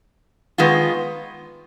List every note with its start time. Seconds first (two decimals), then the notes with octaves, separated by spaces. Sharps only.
0.58 D#3 G#3 B3 F4